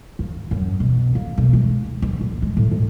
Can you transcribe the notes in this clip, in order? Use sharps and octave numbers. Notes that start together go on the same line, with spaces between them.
D#2
F#2
B2
A#3
B1
G#3
D#2
A#1
G#3
A2
G#2